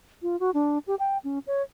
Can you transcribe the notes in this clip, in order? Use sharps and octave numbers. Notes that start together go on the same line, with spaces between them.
F4
F#4
D4
G4
G5
C#4
C#5